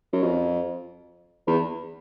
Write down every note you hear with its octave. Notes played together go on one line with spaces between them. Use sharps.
F#2
F2
E2